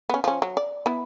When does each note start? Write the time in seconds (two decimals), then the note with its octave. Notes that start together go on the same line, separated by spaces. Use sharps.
0.09 B3 C#4
0.24 F3 C#4
0.42 F#3
0.57 D5
0.86 B3 E4